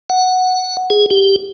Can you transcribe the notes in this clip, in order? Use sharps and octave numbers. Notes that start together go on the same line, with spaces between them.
F#5
G#4
G4